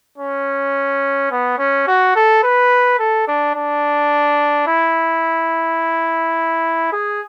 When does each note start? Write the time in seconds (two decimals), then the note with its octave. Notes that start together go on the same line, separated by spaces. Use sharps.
0.18 C#4
1.31 B3
1.58 C#4
1.87 F#4
2.15 A4
2.43 B4
2.99 A4
3.27 D4
3.55 D4
4.67 E4
6.92 G#4